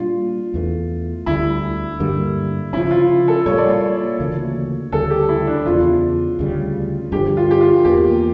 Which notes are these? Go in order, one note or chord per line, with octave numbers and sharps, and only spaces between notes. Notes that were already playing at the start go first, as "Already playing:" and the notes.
Already playing: A#2 G3 D4 F4
E2 E3 A3
D2 D3 G3 E4
G2 D3 G3 A#3
C#3 F3 C#4 E4
F4
A4
A#2 G3 A#3 C#5
D5
C#5
D2 C#3 E3 A#3
D2 C#3 G3 A4
G4
E4
D4
E2 C#3 F3 F4
D2 C#3 G3
G2 D3 F3 G4
F4
G4
F4
E2 E3 A#3 G4